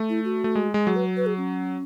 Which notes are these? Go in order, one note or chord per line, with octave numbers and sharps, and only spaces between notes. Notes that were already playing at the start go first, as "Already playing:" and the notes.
Already playing: A3
E4
F#4
A3
G#3
G#3
F#3 G#4
B4
B4
G#4
C#4